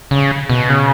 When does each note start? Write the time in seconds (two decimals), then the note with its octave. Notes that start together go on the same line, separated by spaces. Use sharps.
0.11 C#3
0.50 B2
0.69 C#3